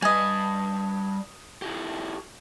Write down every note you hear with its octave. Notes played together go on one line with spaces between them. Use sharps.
G3 B4 D#5 G#5
E4 F#4 G4